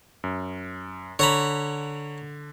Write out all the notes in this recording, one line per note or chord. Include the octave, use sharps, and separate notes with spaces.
F#2
D3 C#5 A#5 B5